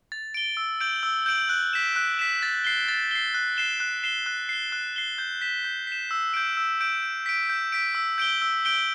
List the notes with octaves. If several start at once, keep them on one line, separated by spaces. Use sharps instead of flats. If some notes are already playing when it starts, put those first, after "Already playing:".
A6
D7 G7
E6
G6 D7 F#7
E6
G6 D7 F#7
F#6
B6 E7
F#6
B6 E7
A6
C7 G7
A6
C7 G7
F#6
C7 E7 G7
F#6
C7 E7 G7
F#6
C7 G7
F#6
C7 G7
G6
B6 E7
G6
B6 E7
E6
G6 D7
E6
G6 D7
G6
B6 D7
G6
B6 D7
E6
G6 D7 G7
E6
G6 D7 G7